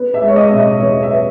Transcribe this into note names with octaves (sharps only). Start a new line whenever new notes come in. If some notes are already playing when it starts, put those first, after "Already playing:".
Already playing: B3
E5
G#3
C#5
D#5
B2 E5
D#5
E2 C#5
E5
B3